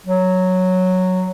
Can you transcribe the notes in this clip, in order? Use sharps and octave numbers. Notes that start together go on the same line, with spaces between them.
F#3